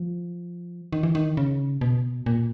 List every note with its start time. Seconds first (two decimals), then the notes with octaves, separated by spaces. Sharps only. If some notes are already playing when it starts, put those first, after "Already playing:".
Already playing: F3
0.93 D#3
1.03 E3
1.15 D#3
1.37 C#3
1.81 B2
2.26 A#2